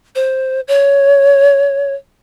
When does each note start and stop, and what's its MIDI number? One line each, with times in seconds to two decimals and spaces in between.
0.15 0.60 72
0.68 1.93 73